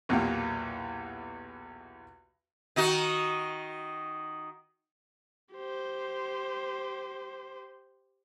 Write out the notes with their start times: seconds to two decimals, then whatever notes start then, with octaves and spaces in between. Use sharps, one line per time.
0.09 B1 E2 A#2 F4 G4
2.76 D#3 D#4 F#4
5.54 G4 C5